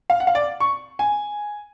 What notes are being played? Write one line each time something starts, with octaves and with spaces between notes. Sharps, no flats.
F5
F#5
F5
D5
C#6
G#5